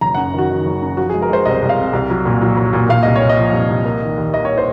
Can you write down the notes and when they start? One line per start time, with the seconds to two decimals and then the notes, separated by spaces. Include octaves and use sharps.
0.01 F#1 A#5
0.15 F#2 F#5
0.34 D#3 F#4
0.50 D#3
0.66 F#1
0.82 F#2
0.97 F3 F#4
1.10 G#3 G#4
1.22 A#4
1.29 G#3 C5
1.46 C2 D#5
1.62 C2
1.69 F5
1.78 C3
1.93 C2
2.10 F#3
2.26 A#2
2.41 F#3
2.57 F#3
2.73 A#2
2.89 A#2 F5
3.03 C2 D#5
3.16 C#5
3.22 A#2
3.29 D#5
3.37 F3
3.53 C2
3.69 C2
3.85 A#3
4.02 D#3
4.17 D#2
4.34 A#3 D#5
4.45 C#5
4.58 C5